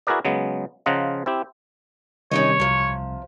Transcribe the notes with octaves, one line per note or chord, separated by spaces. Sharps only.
E4 F#4 G#4 A#4 B4 D5
C#3 F#3 G#3 B3
C#3 F3 F4 D#5 F#5 A#5
C4 E4 G4
C3 D#3 G3 C#4 D#4 C#5 D#5
C2 C3 F3